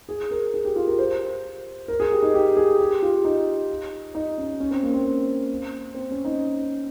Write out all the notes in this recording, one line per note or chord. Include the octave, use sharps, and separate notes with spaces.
G#4
A#4
G#4
G4
F4
A#4
C5
A#4
G#4
G4
D#4
G4
G#4
G4
F4
D#4
D#4
C#4
C#4
C4
A#3
C4
C4
C4
C#4
D#4